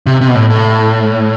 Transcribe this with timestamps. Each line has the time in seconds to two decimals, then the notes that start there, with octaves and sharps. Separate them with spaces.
0.06 C3
0.21 C3
0.28 B2
0.35 A2
0.50 A2